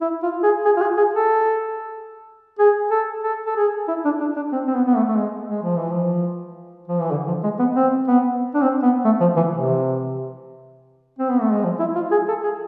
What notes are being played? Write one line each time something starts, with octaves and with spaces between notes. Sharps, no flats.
E4
F4
G#4
G#4
F4
G#4
G#4
A4
G#4
A4
A4
A4
G#4
E4
D4
D4
D4
C4
C4
B3
B3
A3
A3
G#3
G#3
F3
E3
F3
F3
E3
D3
F3
G#3
B3
C4
B3
D4
C4
B3
A3
F3
E3
C3
C4
B3
A3
G#3
F3
E4
F4
G#4
A4
G#4